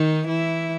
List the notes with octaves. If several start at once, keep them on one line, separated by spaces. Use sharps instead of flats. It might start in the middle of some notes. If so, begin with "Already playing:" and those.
Already playing: D#3 D#4
E3 E4